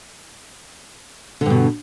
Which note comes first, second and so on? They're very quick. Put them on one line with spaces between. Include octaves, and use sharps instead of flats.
D3 G2 B2